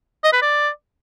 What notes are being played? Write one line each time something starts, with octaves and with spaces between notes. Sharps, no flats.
D#5
B4
D5